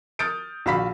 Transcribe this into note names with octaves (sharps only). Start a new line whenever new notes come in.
D#6 F6 G6 A6 C#7 D7
A#1 F#4 F5 B5 B6